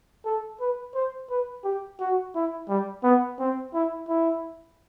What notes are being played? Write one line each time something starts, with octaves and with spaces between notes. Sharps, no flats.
A4
B4
C5
B4
G4
F#4
E4
G3
B3
C4
E4
E4